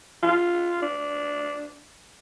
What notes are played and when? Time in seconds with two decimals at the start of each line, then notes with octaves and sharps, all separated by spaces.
0.23 F4
0.82 D4